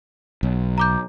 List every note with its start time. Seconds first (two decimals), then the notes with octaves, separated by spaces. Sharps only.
0.43 B1
0.78 A#5 D6 G6